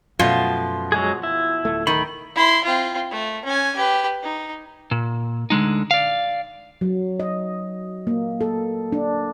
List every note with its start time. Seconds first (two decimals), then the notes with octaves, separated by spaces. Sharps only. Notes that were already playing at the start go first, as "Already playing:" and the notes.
0.19 F#2 B2 F3 A3 F4
0.92 F#3 G#3 G#4
1.23 E4
1.65 D1 A3
1.87 D#3 B5
2.35 E4 C6
2.64 C4 F4
3.11 A3
3.45 C#4 G#5
3.76 G4 B4
4.23 D#4
4.91 A#2
5.50 D2 D3 G#3 D#4
5.91 D5 F5
6.81 F#3
7.20 D#5
8.07 A#3
8.41 A4
8.92 D4